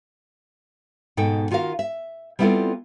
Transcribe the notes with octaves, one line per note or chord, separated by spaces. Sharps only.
G#2 B2 D#4 A4 G5
D#3 F4 F#4 A#4 F5
E5
G3 B3 C4 E4 F4 A4